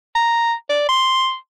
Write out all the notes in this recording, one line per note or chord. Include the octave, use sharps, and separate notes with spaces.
A#5
D5
C6